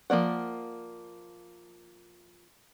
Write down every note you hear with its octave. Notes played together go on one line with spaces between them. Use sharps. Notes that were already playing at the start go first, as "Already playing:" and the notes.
F3 A#3 D5 F#5